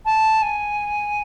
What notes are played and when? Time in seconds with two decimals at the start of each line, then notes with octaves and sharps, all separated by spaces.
0.05 A5
0.42 G#5